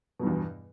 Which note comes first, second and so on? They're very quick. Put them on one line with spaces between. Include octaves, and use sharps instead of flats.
B2 G2 E2